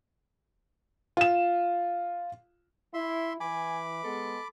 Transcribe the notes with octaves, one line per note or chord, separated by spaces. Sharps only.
F4 E7
E4 E5 C6
E3 G#5 B5 D6
G#3 B3 A4